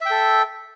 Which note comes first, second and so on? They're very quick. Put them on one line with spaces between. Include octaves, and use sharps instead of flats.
E5 G5 A4